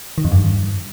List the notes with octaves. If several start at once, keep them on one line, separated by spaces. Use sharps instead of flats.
D#3
F2
G2